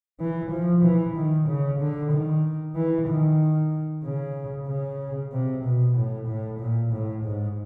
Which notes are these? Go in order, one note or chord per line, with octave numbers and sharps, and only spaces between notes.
E3
F3
E3
D#3
C#3
D3
D#3
E3
D#3
C#3
C#3
C3
B2
A2
A2
A#2
A2
G#2